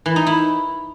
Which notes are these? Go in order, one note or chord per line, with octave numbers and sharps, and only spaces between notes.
E3
D#4
E4